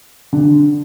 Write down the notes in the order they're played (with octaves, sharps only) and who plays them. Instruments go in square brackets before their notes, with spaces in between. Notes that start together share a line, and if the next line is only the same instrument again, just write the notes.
[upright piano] D3